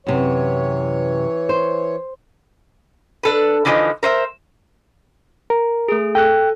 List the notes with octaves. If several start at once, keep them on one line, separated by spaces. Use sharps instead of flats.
F#2 C3 E3 C#5
C5
D4 A4 B4
D3 E3 F3 G3 G#3 D#4
A#4 C5 D#5 E5
A#4
A3 G#4
A4 G5 F#6